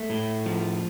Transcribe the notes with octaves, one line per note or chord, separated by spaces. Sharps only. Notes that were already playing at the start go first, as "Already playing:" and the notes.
Already playing: A3
A2
F3